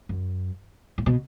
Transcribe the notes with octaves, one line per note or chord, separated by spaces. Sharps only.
F#2
A2
B2